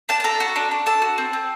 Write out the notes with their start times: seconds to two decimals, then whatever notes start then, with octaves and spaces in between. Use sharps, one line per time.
0.09 D4 A5
0.20 A5
0.24 A4 A#5
0.40 F#4
0.56 D4
0.71 D4
0.86 A4 A5
1.02 F#4
1.18 C4
1.33 C4